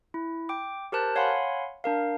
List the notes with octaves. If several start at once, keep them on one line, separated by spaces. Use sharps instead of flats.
E4
G5 D6
G4 A#4 C5 A5 F#6
C#5 F5 F#5 G#5 B5 C6
D4 A#4 F5